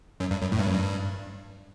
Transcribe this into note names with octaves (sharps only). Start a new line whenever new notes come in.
F#2
G2
F#2
A2
G2
F#2
G2